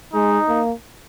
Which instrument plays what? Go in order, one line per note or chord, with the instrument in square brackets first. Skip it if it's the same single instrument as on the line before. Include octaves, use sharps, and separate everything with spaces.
[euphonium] G#3 [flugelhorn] D#4
[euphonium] A#3